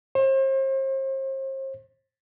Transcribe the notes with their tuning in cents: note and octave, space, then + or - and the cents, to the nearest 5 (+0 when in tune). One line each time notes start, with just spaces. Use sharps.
C5 +40